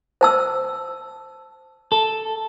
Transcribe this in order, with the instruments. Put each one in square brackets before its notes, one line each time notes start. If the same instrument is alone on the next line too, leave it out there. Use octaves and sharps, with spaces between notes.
[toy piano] C5 A5 E6
[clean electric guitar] A4